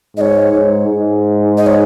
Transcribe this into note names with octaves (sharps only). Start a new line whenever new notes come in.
G#2 C#5 D#5
G#2
G#2
D#5
C#5